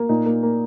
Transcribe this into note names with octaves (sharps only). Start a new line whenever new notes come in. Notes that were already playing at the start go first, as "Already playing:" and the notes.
Already playing: A#3
A#2 D#4
A#3
A#3